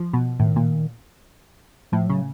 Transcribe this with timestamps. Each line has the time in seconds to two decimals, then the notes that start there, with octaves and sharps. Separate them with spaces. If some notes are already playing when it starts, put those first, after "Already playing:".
Already playing: F3
0.13 B2
0.40 A2 D#3
0.56 A#2
1.92 A2 F3
2.07 C#3 F#3